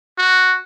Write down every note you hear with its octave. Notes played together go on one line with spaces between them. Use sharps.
F#4